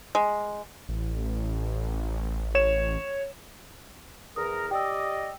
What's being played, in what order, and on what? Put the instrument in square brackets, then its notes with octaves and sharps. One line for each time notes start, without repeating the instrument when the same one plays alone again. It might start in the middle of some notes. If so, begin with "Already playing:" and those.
[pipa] G#3
[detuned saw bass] A1
[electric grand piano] C#5 E7
[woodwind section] E2 A#4 [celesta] D#6
[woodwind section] G4 D5 D#5 [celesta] G5 E6